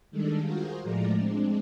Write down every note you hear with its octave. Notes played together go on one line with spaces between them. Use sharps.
D#3 G3 G#3 D4 A4
F4 F#4 G#4 A#4 C5
A2 F3 G#3 A3 D5 A#5
G#3 C4 D4